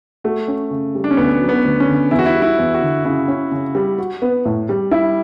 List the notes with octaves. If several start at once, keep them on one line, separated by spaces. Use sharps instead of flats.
A3 F#4
C#4
C#3
G3
D4
C#4
D2 B3
F#3
B3
D2
C#4
D3
E2 E4
F#4
E4
G3
E4
E2
F#4
D3
C#3 E4
C#4
C#3
G3
F#4
B3
A2
G3
G3 E4